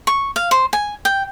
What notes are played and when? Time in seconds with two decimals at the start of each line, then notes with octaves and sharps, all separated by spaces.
0.07 C#6
0.36 F5
0.51 C5
0.73 G#5
1.05 G5